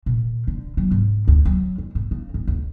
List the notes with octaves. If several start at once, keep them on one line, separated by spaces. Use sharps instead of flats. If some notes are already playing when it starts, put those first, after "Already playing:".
A#2
D3
F#3
G#2
D2
F#3
F2
G#2
C#3
D2
D2